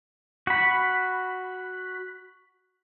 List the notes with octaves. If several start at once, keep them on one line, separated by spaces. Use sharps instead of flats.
F#4 B5